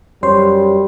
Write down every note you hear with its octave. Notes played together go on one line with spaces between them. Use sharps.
F#2 G3 C5 C#5 C6